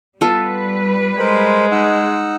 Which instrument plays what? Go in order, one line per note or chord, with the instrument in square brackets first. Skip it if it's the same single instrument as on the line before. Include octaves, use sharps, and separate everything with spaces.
[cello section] G3 B4 [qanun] B3 F4 A4
[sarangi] G#3 [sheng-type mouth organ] A#4 C5 B5
[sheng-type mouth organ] D#4 F#5 E6